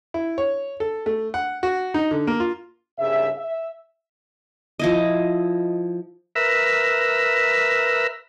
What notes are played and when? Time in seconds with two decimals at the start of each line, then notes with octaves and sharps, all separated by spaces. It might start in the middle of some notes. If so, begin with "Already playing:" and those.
0.14 E4
0.38 C#5
0.80 A4
1.06 A3
1.34 F#5
1.63 F#4
1.94 D#4
2.11 D3
2.27 A#3
2.40 F4
2.99 C2 G2 C#3 G#4 E5
3.37 E5
4.79 F3 E4 D#5
6.36 A#4 B4 E5